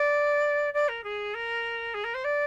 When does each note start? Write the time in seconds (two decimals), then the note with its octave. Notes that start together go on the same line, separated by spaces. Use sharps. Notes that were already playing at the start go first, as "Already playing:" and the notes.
Already playing: D5
0.73 D5
0.88 A#4
1.03 G#4
1.34 A#4
1.93 G#4
2.03 A#4
2.14 C5
2.24 D5